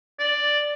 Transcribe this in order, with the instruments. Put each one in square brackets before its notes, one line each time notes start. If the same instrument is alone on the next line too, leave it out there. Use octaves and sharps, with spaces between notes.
[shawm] D5